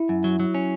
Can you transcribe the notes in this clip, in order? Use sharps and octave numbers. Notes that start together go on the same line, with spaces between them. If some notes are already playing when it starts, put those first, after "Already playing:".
Already playing: E4
F#2
F#3
F#3
C#4